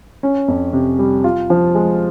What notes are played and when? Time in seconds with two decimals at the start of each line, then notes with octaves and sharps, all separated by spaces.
0.23 C#4
0.48 F2
0.73 C3
0.99 G3
1.24 F4
1.50 F3
1.75 G#3